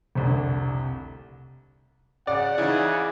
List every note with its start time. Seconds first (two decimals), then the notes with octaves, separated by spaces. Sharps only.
0.15 F1 C2 D3
2.27 C#3 D5 F#5
2.58 C#3 E3 D#4 E4